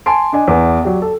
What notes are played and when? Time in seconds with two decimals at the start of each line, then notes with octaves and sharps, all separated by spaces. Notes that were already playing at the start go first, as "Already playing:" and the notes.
0.06 G#5 A5 C6 D7
0.33 D4 D#5 G#5
0.48 E2 B3
0.82 F#3 G4 D5
1.02 A4